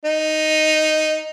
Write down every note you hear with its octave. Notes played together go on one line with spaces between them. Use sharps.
D#4